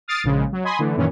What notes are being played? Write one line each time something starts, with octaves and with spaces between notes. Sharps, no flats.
D#6 F6 A6 C7 D7
A#1 C#3 G#3
F#3
D#5 G#5 B5 C6 D#6
D3 E3 A3
F#2 A#2 D#3 E3 C#4